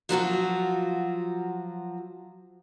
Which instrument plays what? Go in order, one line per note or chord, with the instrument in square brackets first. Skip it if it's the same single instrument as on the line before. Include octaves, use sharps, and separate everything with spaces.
[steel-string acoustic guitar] F3 F#3 F4 F#4